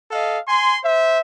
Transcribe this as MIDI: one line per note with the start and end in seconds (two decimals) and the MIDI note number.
0.11 0.39 69
0.11 0.39 75
0.11 0.39 77
0.48 0.78 80
0.48 0.78 84
0.84 1.20 72
0.84 1.20 76